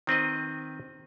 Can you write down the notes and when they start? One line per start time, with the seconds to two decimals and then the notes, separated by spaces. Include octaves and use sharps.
0.07 D#3 C4 B4 D#5